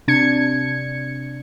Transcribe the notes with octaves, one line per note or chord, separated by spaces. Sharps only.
C3 D4 G#6 C#7